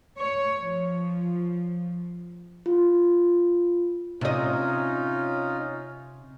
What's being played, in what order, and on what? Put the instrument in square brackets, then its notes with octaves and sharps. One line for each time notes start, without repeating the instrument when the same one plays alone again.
[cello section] C#5
F3
[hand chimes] F4
[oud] C3 D#5 [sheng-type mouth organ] C#4 D#4 F4